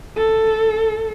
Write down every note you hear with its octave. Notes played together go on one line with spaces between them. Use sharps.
A4